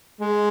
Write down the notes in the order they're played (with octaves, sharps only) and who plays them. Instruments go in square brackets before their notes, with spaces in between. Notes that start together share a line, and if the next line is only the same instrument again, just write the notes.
[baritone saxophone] G#3